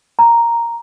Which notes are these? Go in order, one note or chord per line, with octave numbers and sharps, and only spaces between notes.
A#5